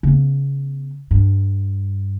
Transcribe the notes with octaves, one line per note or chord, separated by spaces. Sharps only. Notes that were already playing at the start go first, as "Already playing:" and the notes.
C#3 B3
G2